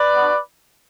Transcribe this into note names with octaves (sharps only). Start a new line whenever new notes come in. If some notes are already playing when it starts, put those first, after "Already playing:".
Already playing: B4 D5
B3 D4 F#4